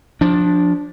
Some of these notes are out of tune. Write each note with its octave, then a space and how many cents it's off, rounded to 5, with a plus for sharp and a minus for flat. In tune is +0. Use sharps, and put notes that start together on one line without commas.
F3 +20 D4 -5